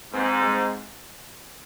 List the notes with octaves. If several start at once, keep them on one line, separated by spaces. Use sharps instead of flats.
G#2 C4
G#3